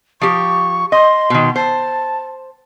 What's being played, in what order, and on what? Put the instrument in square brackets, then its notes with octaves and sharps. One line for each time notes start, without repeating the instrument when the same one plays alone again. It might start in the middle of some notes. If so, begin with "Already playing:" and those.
[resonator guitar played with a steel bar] F3 G4 [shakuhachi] C#6
[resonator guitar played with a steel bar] D#5 [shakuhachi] C6
[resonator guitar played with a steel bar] B2 D#3
[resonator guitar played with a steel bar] C5 [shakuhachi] A5